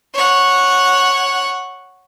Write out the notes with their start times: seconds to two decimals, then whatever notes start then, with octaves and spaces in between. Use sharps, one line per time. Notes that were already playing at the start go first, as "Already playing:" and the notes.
0.14 C#5 F#5